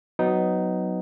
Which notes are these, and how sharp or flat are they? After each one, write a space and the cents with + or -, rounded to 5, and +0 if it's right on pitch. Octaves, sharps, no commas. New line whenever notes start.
F#3 +0 B3 +20 D#4 +0